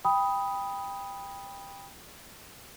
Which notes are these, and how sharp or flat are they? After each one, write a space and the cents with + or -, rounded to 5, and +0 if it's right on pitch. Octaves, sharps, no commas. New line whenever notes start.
G5 +20 B5 +0 D#6 +10